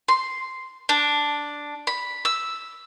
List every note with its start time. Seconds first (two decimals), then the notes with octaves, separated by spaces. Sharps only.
0.08 C6
0.89 D4
1.87 B5
2.25 E6